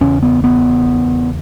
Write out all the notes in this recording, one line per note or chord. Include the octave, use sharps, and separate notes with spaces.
E2 C#3 C#4
B3
B3